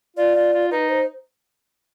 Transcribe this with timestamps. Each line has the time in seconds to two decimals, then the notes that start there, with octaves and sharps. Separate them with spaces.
0.17 F4 D5
0.35 F4
0.53 F4
0.71 D#4 B4
0.89 C5